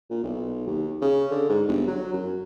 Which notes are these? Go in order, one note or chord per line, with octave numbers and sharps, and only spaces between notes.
A#2
B1
D#2
C#3
D3
G#2
G1
F#3
F#2